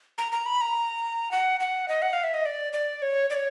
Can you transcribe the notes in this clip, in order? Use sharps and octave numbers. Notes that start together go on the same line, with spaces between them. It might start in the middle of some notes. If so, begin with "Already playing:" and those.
A#5
A#5
B5
A#5
F#5
F#5
D#5
F#5
F5
E5
D#5
D5
D5
C#5
D5
C#5